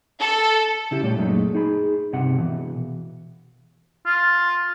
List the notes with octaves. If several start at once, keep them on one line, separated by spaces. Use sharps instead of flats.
A4
C#3 E4 G4
A#2 G3 A3 G4 C#5
F#2 A#2 F#3 G#3 A3 D#4
D#4 G#4 B5
C#2 G2 C3 F#5
B2 E3
F4